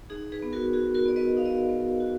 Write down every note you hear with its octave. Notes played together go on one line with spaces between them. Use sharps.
D#4 G#4
G#4 B4
B3
F#4 A#4
F#4 G#4
F#4 A#4
B3 D5
B4 D#5
D#4 F5
D#5
D5 F5
B3
F#4